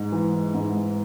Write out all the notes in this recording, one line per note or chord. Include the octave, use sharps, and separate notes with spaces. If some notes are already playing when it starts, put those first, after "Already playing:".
Already playing: G#2
E3
G#2